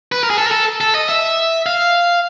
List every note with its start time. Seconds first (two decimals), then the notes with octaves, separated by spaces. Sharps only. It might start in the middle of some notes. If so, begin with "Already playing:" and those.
0.12 B4
0.23 A#4
0.30 G#4
0.38 A4
0.47 A#4
0.52 A4
0.81 A4
0.95 D#5
1.09 E5
1.66 F5